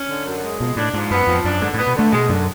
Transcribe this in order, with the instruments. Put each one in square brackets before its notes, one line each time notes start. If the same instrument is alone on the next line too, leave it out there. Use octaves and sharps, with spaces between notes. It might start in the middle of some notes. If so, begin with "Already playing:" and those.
Already playing: [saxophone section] C#4
D3
F#2
G#3
[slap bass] B2 [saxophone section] F3
[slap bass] A2 [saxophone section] D4
[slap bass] G#2 [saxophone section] F3
[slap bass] F#2 [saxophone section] B3
[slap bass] F2 [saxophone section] F3
[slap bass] F#2 [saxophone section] D4
[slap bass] G#2 [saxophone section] D3
[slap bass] A2 [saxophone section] B3
[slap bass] B2
[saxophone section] D3 [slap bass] A3
[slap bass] B2 [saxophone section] G#3
[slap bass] F#2 [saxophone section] D3